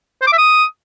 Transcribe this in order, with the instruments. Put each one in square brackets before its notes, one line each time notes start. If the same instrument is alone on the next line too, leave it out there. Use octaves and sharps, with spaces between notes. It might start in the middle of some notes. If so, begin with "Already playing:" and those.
[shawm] C5
D6
E5
D#6